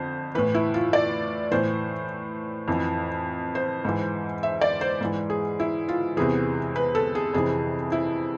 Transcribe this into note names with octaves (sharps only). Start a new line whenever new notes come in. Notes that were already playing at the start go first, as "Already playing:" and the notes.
Already playing: F2 D3 C5
A2 E3 B4
E4
F4
D5
A2 E3 C5
F2 E3
C5
G#2 E3
E5
D5
C5
G#2 E3
G#4
E4
F4
E2 C3 E3 G#4
B4
A4
G#4
F2 C3 E3 G#4
E4